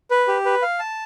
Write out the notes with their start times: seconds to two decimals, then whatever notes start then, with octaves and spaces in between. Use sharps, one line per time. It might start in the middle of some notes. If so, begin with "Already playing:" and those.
0.11 B4
0.28 G4
0.45 B4
0.62 F5
0.79 A5